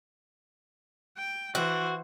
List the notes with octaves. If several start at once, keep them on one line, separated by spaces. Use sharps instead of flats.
G5
E3 F#4 C5